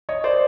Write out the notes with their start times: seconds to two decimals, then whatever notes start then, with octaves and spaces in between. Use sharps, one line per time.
0.09 C#5 D#5
0.24 C5 D5